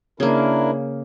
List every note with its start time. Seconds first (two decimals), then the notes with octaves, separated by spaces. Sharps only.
0.20 C#3 A#3 D4 E4 A#4